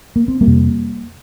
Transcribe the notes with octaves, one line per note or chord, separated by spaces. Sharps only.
A#3
C4
G3 A#3
F2 C3